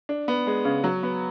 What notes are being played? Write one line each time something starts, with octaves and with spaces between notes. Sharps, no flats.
D4
B3
G#3
C#3
F#3
B3